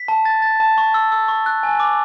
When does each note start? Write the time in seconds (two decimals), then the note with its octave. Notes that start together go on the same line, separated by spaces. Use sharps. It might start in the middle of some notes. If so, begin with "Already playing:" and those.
Already playing: B6
0.08 A5
0.25 A6
0.42 A6
0.60 A5
0.78 C#6
0.94 E6
1.12 E6
1.28 C#6
1.46 F#6
1.63 G#5
1.80 D6